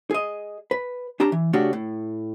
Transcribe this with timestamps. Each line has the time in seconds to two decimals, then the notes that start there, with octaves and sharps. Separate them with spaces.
0.11 G#4 D#5
0.71 B4
1.20 C#4 D4 G4 A5 A#5
1.32 E3
1.53 C#3 A3 C#4 D4 F#4 G4
1.73 A2